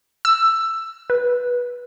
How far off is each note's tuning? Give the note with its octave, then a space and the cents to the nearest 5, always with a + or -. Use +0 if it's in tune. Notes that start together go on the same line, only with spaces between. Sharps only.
E6 +10
B4 -15